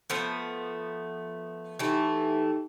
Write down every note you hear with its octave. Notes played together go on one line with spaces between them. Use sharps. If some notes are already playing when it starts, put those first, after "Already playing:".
F3 A3 B3
E3 A3 D#4 G4 G5